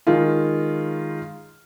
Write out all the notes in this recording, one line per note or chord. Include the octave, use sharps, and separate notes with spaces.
D#3 G#3 F4